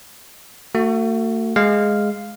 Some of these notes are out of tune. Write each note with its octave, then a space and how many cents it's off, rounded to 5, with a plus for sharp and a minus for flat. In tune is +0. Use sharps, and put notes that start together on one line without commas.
A3 +40 F#4 +0
G#3 +0 F5 +0